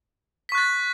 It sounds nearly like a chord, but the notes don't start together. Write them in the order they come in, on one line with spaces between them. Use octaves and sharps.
B6 C#6 F#6 A6